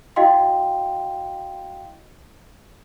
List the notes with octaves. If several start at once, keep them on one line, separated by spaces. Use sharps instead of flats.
E4 F#4 D#5 F5 G5 C6